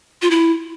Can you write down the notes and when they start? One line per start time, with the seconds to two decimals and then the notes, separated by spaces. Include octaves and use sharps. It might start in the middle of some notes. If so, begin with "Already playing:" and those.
0.22 F4
0.31 E4